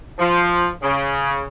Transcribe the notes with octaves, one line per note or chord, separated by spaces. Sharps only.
F3
C#3